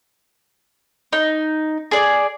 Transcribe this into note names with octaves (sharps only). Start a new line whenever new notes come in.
D#4
G#4 D5